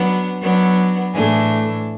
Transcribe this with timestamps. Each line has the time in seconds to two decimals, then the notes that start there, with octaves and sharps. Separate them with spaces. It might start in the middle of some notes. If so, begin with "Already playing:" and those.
Already playing: F#3 B3 D4
0.41 F#3 B3 D4
1.13 A2 E3 A3 D4 G#4